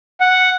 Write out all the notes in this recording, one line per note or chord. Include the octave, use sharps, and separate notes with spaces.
F#5